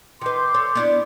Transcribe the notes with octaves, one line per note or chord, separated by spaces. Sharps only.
D#3 B4 C6 D6 G6
A4 C#5
B3 D4 E4